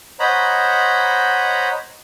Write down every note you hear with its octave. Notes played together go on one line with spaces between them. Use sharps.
C5 C#5 D#5 F#5 A#5 B5